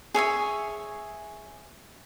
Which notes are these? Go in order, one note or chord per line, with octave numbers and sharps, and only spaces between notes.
G#4 C#5 E5 G#5